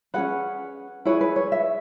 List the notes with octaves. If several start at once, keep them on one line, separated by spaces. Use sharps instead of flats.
C#4 G#4 B4 F#5
E4 G#4 B4 C#5
B4
C#5
E5